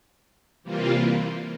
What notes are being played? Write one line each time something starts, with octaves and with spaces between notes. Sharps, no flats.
C3 E3 G3 A#3 F4